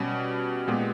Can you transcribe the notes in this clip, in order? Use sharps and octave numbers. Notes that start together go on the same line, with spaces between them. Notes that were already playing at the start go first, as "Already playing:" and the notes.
Already playing: B2 G3 C#4
A#2 G#3 B3 G4